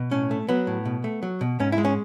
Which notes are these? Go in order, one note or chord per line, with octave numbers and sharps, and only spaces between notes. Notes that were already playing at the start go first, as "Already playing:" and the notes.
Already playing: B2
A2 C#4
A3
F#3 B3
A2
B2
A3
F#3
B2
G#2 C#4
E4
G#3
C#4